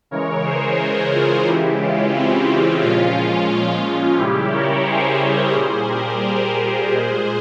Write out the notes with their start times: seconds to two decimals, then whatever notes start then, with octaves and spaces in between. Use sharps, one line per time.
0.11 C#3 E3 G#3 A#4 C#5
0.45 G#4 C5
1.12 F4 G#4
1.47 C#3 E3 G#3 E4 G4
1.81 C#4 F4
2.15 C4 E4
2.83 A#2 F3 G#3 C#4 F4
4.18 C#3 G3 E4 G4
4.53 A#4 C#5
4.87 G#4 C5
5.21 A#4 C#5
5.54 A#2 G3 G#4 C5
5.89 G4 A#4
6.23 G4 A#4
6.57 G4 A#4
6.91 A#2 G#3 G#4 C5